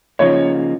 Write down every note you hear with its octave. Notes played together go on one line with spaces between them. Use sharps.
C#3 F3 A#3 D#4 C#5